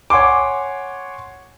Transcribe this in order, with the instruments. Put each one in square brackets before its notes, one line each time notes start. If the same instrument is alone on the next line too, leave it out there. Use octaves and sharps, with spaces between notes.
[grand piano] C#5 F#5 G#5 C6 D6